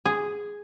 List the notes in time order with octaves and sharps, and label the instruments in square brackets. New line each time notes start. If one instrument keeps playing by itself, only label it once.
[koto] G#4